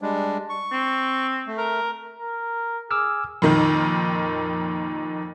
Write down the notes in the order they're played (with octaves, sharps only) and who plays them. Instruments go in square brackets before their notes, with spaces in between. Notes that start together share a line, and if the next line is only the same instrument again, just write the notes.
[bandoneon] G3 G#3 D4
C#6
[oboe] C4
[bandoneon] A3
[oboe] A#4
[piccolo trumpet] A#4
[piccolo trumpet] G#4 [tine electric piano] D6 E6 F6
[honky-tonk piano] F2 A#2 D#3